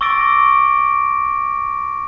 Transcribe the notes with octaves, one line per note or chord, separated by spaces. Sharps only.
C#6 D6 E6 A6 A#6 D7